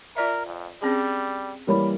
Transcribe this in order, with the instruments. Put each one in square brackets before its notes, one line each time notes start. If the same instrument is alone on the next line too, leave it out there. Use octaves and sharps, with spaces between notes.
[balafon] F4 D5 E5 [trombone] A#4
[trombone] F2
[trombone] G3 [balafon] C4 C#4 G#4
[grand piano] E3 G3 A#3 [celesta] A#4 C#5 B5